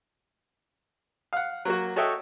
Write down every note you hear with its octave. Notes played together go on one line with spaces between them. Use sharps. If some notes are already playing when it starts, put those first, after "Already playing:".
F5 F#5
F#3 A#3 F#4
F#4 A4 C#5 D#5 E5 G5